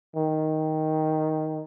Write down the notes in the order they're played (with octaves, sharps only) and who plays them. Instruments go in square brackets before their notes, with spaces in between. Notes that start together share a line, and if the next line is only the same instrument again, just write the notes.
[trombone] D#3